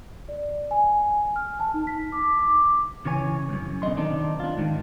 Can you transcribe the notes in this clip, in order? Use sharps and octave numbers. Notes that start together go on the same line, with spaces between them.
D5
G#5
F6
A5
D#4
B6
D6
D6
C#3 E3 C#5 G#5
C#2 F#2
B2 D3 E3 D#5 C6
D#3 C4 D4 D#4
D4 F4
G#2 D#3